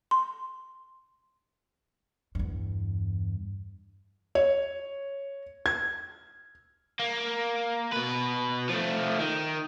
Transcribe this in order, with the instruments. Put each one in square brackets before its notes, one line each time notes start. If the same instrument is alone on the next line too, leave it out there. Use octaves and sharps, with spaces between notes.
[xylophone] C6
[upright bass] E2 G2
[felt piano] C#5
G#6
[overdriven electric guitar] A#3
B2 B4
F3 A3
D#3